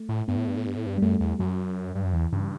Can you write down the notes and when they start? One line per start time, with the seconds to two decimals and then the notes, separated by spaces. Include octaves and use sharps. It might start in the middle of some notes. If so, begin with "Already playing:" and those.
Already playing: A3
0.09 A2
0.28 G2 B3
0.37 A2
0.47 G2
0.57 A2
0.67 G2
0.76 A2
0.86 G2
0.98 G3
1.02 F#2 A3
1.20 E2
1.39 F#2 F#3
1.95 G2
2.04 F#2
2.13 E2 E3
2.33 G2 C#3